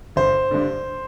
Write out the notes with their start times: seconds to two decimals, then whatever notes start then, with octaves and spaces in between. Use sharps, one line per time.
0.16 G1 C5
0.51 G2 D3